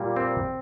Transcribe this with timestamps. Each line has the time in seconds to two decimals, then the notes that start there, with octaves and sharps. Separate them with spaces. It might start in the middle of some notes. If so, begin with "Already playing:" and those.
Already playing: A#2 G3 A#3
0.16 C4